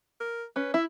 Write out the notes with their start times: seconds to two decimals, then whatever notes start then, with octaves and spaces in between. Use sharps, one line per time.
0.21 A#4
0.56 C#4 B4
0.74 E4 E5